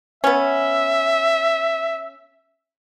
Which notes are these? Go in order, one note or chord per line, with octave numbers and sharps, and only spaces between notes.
B3 C#4 E5